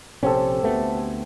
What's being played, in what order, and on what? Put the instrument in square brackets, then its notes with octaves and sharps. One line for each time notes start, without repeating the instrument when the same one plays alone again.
[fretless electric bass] A#1 C3 C#4 [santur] C4 G4 A4
[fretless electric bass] D2 A3 B3
[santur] G#5